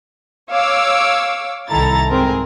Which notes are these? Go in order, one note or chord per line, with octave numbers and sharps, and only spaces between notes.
C#5 F5 D6 E6
C2 D#3 E4 A4 A#5 A6
G#2 C4 G#4 A#4